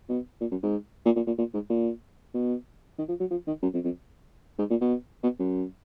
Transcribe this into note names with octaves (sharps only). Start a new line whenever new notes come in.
B2
A#2
F#2
G#2
A#2
A#2
A#2
A#2
G#2
A#2
B2
D#3
F3
F#3
F3
D#3
F#2
F2
F2
G#2
A#2
B2
B2
F#2